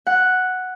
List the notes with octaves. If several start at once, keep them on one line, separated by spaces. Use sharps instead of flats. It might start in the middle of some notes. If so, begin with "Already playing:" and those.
F#5